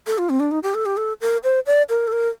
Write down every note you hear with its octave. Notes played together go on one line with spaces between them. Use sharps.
A4
F4
C4
D4
D#4
G4
A4
G4
A4
A#4
C5
D5
A#4
A4
A#4